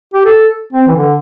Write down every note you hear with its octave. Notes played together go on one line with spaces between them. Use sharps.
G4
A4
C4
E3
D3